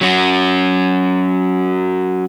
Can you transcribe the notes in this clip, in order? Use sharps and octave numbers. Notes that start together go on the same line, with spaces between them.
F#3 C#4 F#4